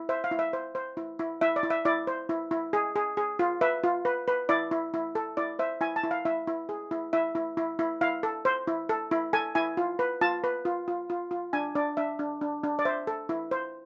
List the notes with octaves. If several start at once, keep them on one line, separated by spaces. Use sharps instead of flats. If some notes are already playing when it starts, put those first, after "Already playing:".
Already playing: E4
C5 E5
F5
E4
E5
C5
C5
E4
E4
E4 E5
D5
E4
E5
E4 D5
C5
E4
E4
G#4
G#4
G#4
F4
B4 E5
F4
B4
B4
E4 D5
E4
E4
A4
E4 D5
C5 E5
E4 G#5
A5
E4
F5
E4 E5
E4
G#4
E4
E4 E5
E4
E4
E4
E4 F5
A4
C5
E4
A4
E4
A4 G#5
E4 G#5
F4
B4
F4 A5
B4
F4
F4
F4
F4
D4 G#5
D4 D5
D4 E5
D4
D4
D4
D5
C5 E5
A4
E4
C5